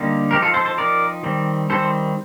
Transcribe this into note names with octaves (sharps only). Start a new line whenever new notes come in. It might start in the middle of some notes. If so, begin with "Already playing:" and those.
Already playing: D3 G3 A#3 D#4
F3 C4 D#4 G4 A#4
F4 A4
A4 C5
A4 C5
F3 C4 D#4 A#4 D5
D#3 G3 C4
D#3 G3 C4 A4 C5